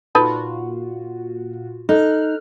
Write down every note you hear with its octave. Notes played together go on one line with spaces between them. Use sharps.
A#2 D#4 F4 F#4 A4 B4
D#4 A4 F6 F#6